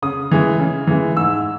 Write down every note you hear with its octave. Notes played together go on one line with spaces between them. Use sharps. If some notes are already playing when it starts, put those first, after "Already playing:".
C#3 D#6
E3 G#3
C#3
E3 G#3
G#2 E6